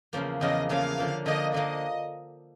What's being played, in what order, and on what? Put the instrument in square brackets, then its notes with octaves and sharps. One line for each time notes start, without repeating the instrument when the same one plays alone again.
[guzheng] E2 C#3 F3 A#3
[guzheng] E2 C#3 F3 A#3 [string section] D#5
[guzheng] E2 C#3 F3 A#3 [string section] F5
[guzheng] D3 F3 A#3
[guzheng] D3 F3 A#3 [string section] D#5
[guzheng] D3 F3 A#3 [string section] D#5